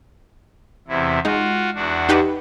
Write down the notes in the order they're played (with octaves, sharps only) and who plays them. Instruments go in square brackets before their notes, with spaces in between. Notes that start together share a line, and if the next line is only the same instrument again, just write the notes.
[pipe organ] E2 C3 E4
[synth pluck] G#3 D#4 [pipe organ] F4 F#4
[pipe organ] E2 D4 F#4
[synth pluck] D#4 G4 B4